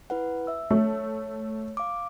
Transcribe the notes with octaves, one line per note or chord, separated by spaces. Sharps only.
E4 B4 F#5
E5 E6
A3 C#5
F5 D6